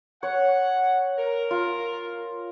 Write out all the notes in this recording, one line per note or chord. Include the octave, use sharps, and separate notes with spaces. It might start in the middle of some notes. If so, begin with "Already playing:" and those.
C#5 F#5
A#4
F4